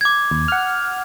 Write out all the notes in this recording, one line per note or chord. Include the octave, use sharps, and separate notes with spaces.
D6 G#6
D#2
F#5 F6